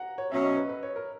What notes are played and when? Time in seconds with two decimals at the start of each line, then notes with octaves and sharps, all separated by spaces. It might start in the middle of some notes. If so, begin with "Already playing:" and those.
Already playing: F#5 A#5
0.18 C#5
0.31 B2 F#3 C#4 E5
0.43 D#5
0.56 B4
0.69 B4
0.83 C#5
0.96 A#4